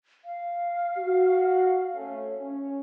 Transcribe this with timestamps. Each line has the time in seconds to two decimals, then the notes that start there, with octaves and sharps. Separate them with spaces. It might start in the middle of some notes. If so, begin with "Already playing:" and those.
0.25 F5
0.97 F#4
1.94 A3 C#4
2.39 C#4